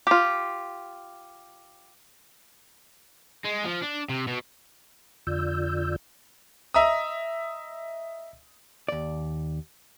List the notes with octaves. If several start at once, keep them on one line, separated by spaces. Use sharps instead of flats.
F4 G4
G#3
F3
D4
C3
B2
F2 D3 F4 D5 E6 G6
D#5 E5 A#5 D#6
D#2 D5